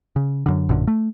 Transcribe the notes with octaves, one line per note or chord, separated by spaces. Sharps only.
C#3
F#2 D3
A1 F#2 A#2 D3
A3